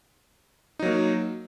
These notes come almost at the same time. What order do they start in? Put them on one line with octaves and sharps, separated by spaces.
D#4 F#3 A#3